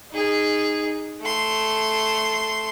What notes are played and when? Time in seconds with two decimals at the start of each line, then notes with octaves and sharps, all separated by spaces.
0.12 D#4 G#4
1.21 A3 C6